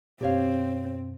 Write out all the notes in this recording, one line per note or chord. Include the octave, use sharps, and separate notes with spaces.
F#2 B2 C4 G4 C#5 F5